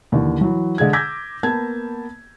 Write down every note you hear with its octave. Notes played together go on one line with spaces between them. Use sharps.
D#2 D3 E3
E3 F#3
D3 G#3 G#4 G#6
D6 E6 G6 G#6 A#6 B6
A#3 B3 A5 G#6